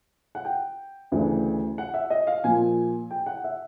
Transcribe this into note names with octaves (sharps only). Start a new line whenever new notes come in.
F#5
G5
D2 C#3 E3 A3 D4
F#5
E5
D#5
F5
A#2 F3 A#3 G#5
G5
F#5
E5